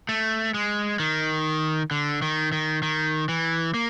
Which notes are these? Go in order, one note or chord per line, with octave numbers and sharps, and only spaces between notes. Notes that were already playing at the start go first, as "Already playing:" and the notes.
A3
G#3
D#3
D3
D#3
D#3
D#3
E3
A#3